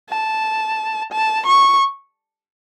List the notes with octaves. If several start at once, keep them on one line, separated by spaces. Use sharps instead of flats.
A5
A5
C#6